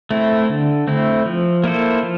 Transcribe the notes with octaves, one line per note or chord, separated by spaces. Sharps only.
A3 C4 E4
D3
A3 C4 E4
F3
A#3 E4 A4 C5
F3